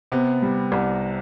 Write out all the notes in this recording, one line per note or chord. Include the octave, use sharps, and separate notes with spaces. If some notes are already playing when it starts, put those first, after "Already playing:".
C3 B3
G3
C2